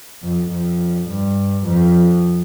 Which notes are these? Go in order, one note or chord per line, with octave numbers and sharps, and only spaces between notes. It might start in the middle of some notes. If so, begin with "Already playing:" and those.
F2
F2
G2
F2